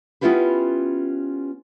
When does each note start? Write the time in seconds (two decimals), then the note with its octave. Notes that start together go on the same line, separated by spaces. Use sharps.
0.21 B3 C#4 E4 F4 G4 B4